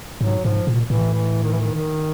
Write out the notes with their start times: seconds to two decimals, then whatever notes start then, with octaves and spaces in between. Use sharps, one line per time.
0.21 G#2 F#3
0.45 G#2 F3
0.67 A#2
0.90 A2 E3
1.13 E3
1.43 D#3
1.52 E3
1.60 D#3
1.74 D#3